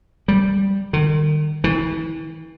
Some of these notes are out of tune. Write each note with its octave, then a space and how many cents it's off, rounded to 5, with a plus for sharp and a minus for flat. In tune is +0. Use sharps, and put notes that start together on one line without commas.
G3 -5
D#3 -40
E3 -35